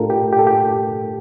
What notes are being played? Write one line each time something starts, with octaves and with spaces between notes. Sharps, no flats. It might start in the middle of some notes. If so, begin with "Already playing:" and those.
Already playing: A2 A3 D4 F4 G4 A4 A#4
G4
G4
A4
G4